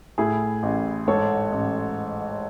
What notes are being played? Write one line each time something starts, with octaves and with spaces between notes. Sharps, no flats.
A2 E4 G#4
A1
G#2 A4 C#5
A1